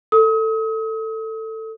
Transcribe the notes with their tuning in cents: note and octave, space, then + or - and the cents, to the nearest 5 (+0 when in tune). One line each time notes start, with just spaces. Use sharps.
A4 +15 D#6 +40